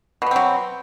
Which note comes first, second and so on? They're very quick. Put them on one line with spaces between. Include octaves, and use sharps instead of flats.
B2 B3 C4 F#3